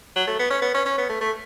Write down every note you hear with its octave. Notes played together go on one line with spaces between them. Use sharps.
F#3
A3
B3
C#4
B3
C#4
C#4
B3
A3
A3